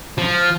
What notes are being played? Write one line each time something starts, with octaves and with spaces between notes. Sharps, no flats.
F3